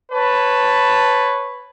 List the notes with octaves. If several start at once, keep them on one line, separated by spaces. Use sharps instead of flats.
B4 C#5 A5